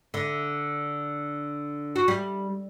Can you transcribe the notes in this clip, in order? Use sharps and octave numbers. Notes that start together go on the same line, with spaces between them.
D3
F#4
G3